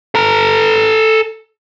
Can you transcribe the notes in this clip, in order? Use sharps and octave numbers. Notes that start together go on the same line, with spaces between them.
A4 A#5